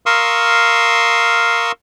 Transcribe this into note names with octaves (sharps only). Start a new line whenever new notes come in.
A#4 F5 C6 C#6 D#6 E6